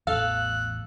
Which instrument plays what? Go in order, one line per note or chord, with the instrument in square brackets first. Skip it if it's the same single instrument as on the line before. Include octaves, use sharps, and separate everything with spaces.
[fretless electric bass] A1 E2 [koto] A4 [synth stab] F5 [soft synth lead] F#6